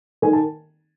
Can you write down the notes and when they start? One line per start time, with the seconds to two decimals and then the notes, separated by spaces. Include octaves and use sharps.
0.22 D#3 G#5
0.33 A5